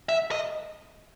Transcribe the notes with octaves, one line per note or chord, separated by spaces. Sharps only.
E5
D#5